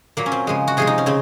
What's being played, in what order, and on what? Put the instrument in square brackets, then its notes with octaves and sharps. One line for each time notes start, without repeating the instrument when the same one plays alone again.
[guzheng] A#2 F#3 A#3
C#4
C4
C#3 F3 G#3
F#4
C3 F3 G#3 G#4
D#4
C#4
C#3 C4